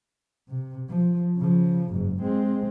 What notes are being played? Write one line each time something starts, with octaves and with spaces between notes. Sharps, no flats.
C3
F3
C#3 F3
F#1 G#2
G#3 C4